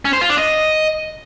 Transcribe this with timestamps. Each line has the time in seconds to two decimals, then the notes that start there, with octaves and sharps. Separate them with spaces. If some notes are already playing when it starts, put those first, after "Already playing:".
0.05 C#4
0.13 C5
0.21 F4
0.30 D4
0.38 D#5